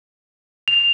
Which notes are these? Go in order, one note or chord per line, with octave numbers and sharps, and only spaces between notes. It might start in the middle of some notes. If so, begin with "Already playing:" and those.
F7